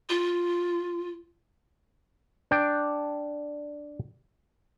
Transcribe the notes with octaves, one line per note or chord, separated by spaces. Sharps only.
F4
D4 G5